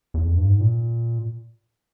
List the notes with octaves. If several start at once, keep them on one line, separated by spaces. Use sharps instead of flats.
E2
F2
G2
G#2
A#2